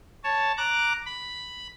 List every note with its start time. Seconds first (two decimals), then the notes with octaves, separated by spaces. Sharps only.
0.24 C#5 A5
0.57 A#5 D6 F#6
1.06 B5